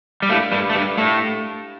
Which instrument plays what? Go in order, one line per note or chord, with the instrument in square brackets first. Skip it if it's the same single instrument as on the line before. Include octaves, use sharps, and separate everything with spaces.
[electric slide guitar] G3
[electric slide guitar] A2 A3 [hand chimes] D4 G4 A#4 F5
[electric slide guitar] G2 G3
A3
G2 G3
A2 A3